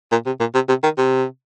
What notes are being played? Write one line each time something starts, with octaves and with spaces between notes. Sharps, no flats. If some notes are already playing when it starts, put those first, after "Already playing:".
A#2
C3
A#2
C3
C3
D#3
C3